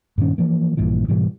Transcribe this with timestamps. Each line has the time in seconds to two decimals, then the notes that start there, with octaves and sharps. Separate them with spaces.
0.18 G2 A#2 D#3 C#4
0.38 E3 F3 A#3
0.77 A#1 G2 A#2 E3
1.08 G#2 B2 E3 G3